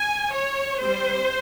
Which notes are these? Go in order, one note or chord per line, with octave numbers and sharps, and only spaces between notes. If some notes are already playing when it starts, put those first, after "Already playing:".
Already playing: G#5
C#5
G3 C4 C5